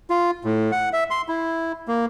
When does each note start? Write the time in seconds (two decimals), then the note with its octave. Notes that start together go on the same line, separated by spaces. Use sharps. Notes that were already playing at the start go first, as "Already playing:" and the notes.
0.10 F4
0.44 A2
0.72 F#5
0.93 E5
1.11 C6
1.28 E4
1.88 A#3